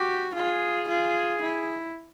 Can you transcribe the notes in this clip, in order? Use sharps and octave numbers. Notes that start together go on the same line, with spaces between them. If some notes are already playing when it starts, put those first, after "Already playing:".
Already playing: F#4 G4
F4 G#4
F4
E4